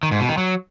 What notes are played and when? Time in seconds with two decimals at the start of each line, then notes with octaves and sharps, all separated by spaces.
0.03 D#3
0.11 G#2
0.20 B2
0.29 D#3
0.38 F#3